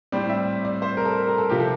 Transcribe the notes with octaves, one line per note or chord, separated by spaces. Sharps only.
A2 G3 C4 D5
E5
D5
C5
A#4
A4
A#4
A4
C3 F3 G4
A4